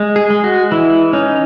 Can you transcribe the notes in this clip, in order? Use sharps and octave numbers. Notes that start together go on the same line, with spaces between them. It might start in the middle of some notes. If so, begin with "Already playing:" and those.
Already playing: G#3
G#4
G#3
F#4
E3 E4
C#4 D#4